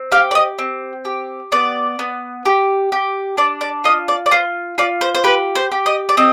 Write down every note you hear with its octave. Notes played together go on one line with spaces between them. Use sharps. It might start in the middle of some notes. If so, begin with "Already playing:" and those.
Already playing: C4
G4 F5
D5
D#5
C4
G4
B3 D5
B3
G4
G4
D4 D5
D5
F4 D#5
D5
D5
F4 C5
F4 D5
C5
C5
G4 B4
C5
G4
D#5
D5
C4 D#5